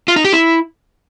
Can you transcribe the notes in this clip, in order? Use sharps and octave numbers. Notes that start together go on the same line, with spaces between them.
F4
D#4
G4
E4